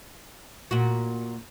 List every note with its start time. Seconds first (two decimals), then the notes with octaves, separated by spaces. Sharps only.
0.71 A#2 F#4